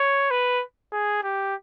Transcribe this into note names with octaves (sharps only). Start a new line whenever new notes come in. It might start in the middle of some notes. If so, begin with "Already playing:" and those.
Already playing: C#5
B4
G#4
G4